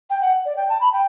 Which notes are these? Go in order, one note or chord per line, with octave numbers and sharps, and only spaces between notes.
G5
F#5
D5
G5
A5
B5
G5